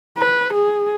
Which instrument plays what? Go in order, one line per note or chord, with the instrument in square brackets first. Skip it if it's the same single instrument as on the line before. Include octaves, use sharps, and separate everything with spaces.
[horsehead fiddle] B4
G#4